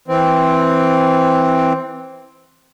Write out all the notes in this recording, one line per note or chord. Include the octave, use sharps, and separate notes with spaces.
E3 C4